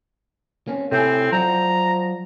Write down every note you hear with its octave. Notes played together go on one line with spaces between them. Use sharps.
A#3 C4 C#4
A2 C3 C4 G#5
F3 F#3 D5 F#5 A#5